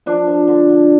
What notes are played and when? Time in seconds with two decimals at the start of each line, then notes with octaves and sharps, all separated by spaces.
0.06 F3 D4
0.27 F3
0.48 D3
0.69 D3